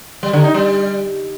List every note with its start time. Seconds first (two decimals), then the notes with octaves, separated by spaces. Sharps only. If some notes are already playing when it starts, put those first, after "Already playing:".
0.23 G3
0.33 D3
0.44 D#4
0.54 G3